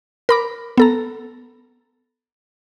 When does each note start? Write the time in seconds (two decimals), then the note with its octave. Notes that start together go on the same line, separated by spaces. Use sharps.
0.29 A#4 B5 D6
0.78 B3 A4 A#5